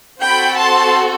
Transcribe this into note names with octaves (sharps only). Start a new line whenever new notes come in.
C4 F#4 A4 G5 B5
A5 C6